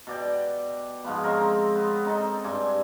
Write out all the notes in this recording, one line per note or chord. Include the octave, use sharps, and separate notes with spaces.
B2 D5 G5
G#2 F3 B3
C4 A#4 C#5 D#5
B3
C4 D#4 A4
G2 G#5 C6 D6